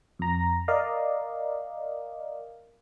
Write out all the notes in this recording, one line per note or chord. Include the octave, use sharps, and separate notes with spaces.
F2 A#5
A#4 D5 D#5 F5